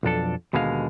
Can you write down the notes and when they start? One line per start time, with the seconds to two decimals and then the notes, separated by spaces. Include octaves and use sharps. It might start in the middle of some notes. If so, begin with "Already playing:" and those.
0.03 B1 F2 D4 A4
0.53 D#2 B2 D3 G#3 A4 F5